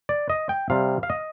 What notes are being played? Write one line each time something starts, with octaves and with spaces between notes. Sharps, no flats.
D5
D#5
G5
C3 G3 F5
F5
D#5